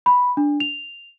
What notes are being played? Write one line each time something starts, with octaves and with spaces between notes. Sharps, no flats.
B5
D4
F7